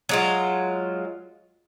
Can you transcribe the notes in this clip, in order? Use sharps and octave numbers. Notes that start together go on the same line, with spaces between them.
F#3 G#3 F4